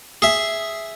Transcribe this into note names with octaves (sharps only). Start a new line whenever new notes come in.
G#4 E5